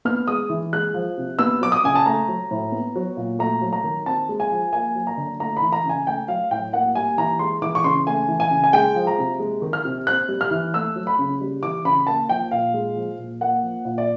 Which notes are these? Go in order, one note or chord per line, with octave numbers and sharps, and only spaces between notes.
B3 F6
G#3 D#6
E3
G#3 F#6
F3
C3
B3 E6
F#3 D6
D#6
C#3 G#5
A5
A3 A#5
F#3
A2
B3
F#3
A#2
A3 A#5
F#3
A#5
D#3
C4 A5
G#3
G#5
F3
A#3 G#5
F#3
A#5
D3
A3 A#5
E3 B5
A#5
C#3 G#5
A3 G5
F#3 F5
A2 G5
A#3 F#5
G3 G#5
E3 A#5
G#3 C6
E3 D6
C#6
C#3 C6
A3 G#5
E3
G#5
C#3
G#5
G#3 G5
F3
A#5
C3
G#3
D#3
F6
C3
C4 F#6
G3
F6
E3
A3 E6
F#3
B5
C#3
G3
E3 D6
C#3 B5
A#3 A5
F3 G5
A#2 F5
G#3
F3
A#2
A#3 F#5
F3
A#2
D5